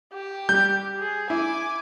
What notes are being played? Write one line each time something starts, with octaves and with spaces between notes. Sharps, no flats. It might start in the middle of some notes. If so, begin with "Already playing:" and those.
G4
G3 G6
G#4
E4 G#5 D6